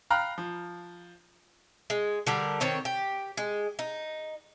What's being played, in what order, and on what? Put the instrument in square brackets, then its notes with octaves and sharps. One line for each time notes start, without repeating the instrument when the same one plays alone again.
[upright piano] F5 G5 A#5 B5 F6 F#6
F3
[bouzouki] G#3
D3 G3 A#4
D#3 C4 C#5
G4
G#3
D#4